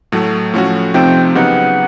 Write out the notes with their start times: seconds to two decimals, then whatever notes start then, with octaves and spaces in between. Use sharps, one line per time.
0.12 A2 F#3 A3
0.53 A2 F3 A3 C#4 F#4
0.94 C3 F3 A3 C4 D#4 G5
1.35 C#3 F#3 B3 D#4 G4 F#5